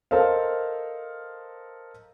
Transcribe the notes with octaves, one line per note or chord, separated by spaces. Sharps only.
A4 A#4 C5 D#5 F5